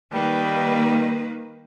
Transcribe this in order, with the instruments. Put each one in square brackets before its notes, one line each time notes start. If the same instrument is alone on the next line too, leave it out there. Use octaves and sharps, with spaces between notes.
[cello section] D#3 A#3 B4 [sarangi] G3